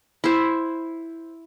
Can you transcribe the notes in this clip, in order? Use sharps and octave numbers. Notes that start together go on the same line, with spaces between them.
E4 C5